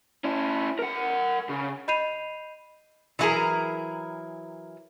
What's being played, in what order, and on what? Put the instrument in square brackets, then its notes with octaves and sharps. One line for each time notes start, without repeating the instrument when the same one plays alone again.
[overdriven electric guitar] C#4 E4
A#4 F#5
C#3
[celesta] D#5 B5 G6 C7 D#7 F7
[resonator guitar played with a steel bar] E3 F#3 E4 G4 G#4 A#4